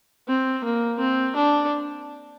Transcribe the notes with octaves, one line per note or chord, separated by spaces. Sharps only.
C4
A#3
C4
D4